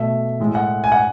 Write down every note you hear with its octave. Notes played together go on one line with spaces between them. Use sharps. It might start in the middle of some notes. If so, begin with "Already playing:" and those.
Already playing: B2 A3 E5
A2 G#3
F#5
G#5
F#5